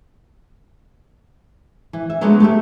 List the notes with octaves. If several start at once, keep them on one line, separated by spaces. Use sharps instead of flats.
E3
E5
D3 F#3 G#3 A3 B3 F#4
A3 G4 E5